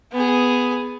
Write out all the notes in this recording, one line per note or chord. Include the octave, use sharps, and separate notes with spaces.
B3 G#4